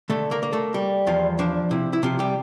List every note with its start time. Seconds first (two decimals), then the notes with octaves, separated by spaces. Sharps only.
0.10 D3 A3 A4
0.31 A#3 A#4
0.43 A#3
0.53 A3 A4
0.74 G3
1.07 E2 F3 F4
1.39 F3 D4
1.71 C3 E4
1.93 E4
2.03 C3 F3 F4
2.19 G3 G4